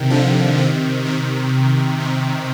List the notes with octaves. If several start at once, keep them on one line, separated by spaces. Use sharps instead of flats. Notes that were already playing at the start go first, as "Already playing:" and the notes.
Already playing: C3 D#3
D3 F3
C3 D#3
C3 D#3
C3